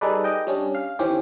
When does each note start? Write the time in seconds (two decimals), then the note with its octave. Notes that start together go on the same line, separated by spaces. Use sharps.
0.01 G3 D#4 G#4 A4 B4 D5
0.24 D#5 G5
0.47 G3 C#4 D4
0.75 F5
0.99 D#3 E3 C4 C#4 G4